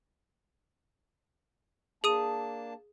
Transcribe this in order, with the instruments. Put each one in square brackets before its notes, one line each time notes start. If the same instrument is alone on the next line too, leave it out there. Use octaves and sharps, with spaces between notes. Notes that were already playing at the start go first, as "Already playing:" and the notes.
[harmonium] A#3 D4 A5 [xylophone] G#4 D#6 D#7